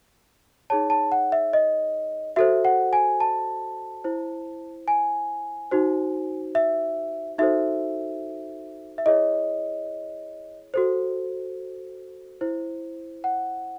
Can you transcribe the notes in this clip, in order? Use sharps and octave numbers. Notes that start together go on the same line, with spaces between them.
D#4 G#4 C#5 A5
A5
F#5
E5
D#5
F#4 A4 C5 E5
F#5
G#5
A5
E4 C5
G#5
D#4 F#4 C5
E5
D#4 F#4 A4 C5 E5
E5
E4 G#4 C#5 D#5
F#4 A4 C5
E4 C5
F#5